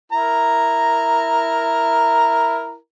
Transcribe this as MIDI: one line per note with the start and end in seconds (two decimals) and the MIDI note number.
0.12 2.76 64
0.12 2.76 70
0.12 2.76 82